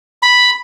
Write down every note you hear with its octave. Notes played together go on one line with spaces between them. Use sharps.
B5